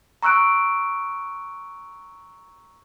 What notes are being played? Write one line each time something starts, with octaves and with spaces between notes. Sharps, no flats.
A#5 C#6 E6 F#6 D7